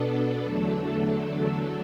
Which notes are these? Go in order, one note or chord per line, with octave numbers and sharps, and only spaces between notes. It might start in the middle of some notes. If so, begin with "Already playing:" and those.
Already playing: B2 B3 D4 A4
E2 D3 F#3 A3 D4 A4